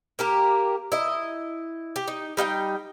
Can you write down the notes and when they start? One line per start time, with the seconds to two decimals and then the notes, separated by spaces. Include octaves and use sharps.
0.19 A#3 G4 A#4
0.92 E4 D#5
1.96 G4
2.08 D#4
2.37 G3 D#4 F5 G5